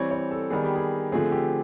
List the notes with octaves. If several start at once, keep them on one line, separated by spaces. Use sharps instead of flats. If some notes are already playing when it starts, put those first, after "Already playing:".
Already playing: E3 G3 C4 C#5
C#5
A4
D#3 G3 B3 G#4
G4
G#4
D3 F3 A3 C4 G#4
G4